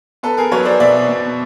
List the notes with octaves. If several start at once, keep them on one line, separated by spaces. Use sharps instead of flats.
B3 A4 B4
G#4 A#4
F#3 B4 C#5
C5 D5
B2 D5 E5
B2